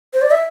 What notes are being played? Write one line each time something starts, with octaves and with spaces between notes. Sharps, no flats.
C5
D5
E5